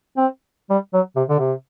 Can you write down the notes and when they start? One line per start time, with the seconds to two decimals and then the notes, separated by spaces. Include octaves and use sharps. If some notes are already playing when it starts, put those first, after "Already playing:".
0.17 C4
0.70 G3
0.94 F#3
1.16 C3
1.29 D3
1.39 C3